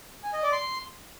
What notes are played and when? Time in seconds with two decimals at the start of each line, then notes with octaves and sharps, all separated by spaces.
0.24 G#5
0.33 D#5
0.43 D5
0.52 C6